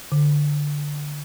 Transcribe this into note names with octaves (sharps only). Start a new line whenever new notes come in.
D3